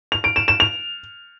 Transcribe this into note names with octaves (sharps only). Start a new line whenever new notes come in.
F7
D7
E7
E7
F7